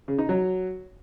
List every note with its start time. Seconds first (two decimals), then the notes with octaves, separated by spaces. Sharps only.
0.08 C#3
0.18 D#4
0.29 F#3